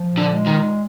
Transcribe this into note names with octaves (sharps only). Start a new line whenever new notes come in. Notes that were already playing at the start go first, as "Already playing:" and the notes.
Already playing: F3
A#2
D3
G#3
D#3
A#2